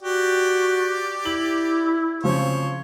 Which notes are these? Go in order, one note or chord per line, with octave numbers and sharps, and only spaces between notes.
F#4 G4 D5
E4 F#7
C#3 F3 C4 C5 C#5